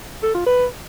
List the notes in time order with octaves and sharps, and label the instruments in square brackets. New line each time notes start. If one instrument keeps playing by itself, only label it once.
[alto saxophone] A4
F4
B4